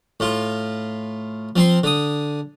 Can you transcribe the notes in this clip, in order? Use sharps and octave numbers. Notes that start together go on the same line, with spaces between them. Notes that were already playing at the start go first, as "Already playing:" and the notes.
A2 F4
F3 C4 C6
D3 D#6